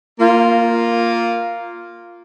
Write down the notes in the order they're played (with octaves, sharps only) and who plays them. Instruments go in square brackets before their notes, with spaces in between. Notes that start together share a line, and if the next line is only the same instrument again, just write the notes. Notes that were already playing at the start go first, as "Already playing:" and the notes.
[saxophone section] A#3 F4